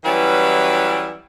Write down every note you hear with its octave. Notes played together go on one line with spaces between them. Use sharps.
E3 F#3 G3 C#4 E4 B4